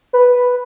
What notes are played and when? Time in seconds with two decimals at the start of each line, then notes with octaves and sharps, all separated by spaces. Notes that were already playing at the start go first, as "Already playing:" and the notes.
0.13 B4